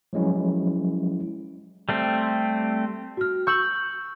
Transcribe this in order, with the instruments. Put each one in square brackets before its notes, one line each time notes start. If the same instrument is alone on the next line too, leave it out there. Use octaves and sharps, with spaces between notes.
[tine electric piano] F3 F#3 G#3 C#4 E4
[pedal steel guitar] G3 A3 C4
[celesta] F#4 F6
[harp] C#6 E6 [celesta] G6 F#7